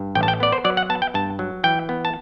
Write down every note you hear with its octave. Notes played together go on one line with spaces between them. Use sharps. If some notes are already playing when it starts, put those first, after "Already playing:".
Already playing: G2
A1 G5
A5
G5
B3 D5
C5
F#3 D5
F#5
B3 A5
G5
G2 A5
F#3
E3 G5
B3
A5